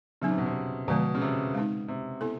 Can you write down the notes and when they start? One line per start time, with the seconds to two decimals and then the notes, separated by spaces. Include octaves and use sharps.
0.22 C#3 F#3 B3 D#4
0.30 C3
0.38 B2
0.46 C3
0.88 B2 D3 F3 G#3 B3
1.15 C#3
1.21 C3
1.55 G#3 C4 D#4
1.88 C3
2.21 B3 E4 A4